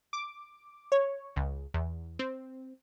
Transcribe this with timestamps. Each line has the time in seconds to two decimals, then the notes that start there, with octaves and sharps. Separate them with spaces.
0.13 D6
0.92 C#5
1.36 C#2
1.74 E2
2.19 C4